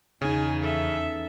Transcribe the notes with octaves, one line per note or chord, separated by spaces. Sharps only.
E2 C#3 C#4 D#4 G#5
A4 E5